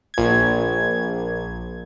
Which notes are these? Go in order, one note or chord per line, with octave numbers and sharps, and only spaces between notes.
A#1 G#6